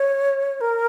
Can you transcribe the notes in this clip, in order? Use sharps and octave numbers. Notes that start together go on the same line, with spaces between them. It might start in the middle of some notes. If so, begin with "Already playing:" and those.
Already playing: C#5
A#4